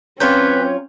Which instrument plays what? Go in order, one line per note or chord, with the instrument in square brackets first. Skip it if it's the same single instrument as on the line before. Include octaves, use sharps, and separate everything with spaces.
[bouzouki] F#3 F4 C#5 [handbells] C4 G6 [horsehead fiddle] C#4 [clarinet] B4